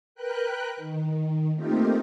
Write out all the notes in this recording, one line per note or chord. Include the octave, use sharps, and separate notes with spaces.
A#4 B4 G5 F#6
D#3
A3 A#3 C4 D#4 F4 G4